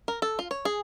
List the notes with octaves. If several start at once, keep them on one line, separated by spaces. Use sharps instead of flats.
A#4
A4
F4
C#5
G#4